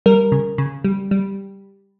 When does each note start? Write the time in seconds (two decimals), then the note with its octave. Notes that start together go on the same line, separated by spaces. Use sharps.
0.06 G3 A#4
0.32 C#3
0.58 C#3
0.84 G3
1.11 G3